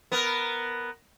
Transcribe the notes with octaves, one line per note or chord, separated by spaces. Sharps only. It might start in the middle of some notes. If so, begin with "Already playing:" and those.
B3 A#4